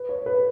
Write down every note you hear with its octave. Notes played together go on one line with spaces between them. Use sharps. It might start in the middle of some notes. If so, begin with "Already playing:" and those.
Already playing: B4
C#5
B4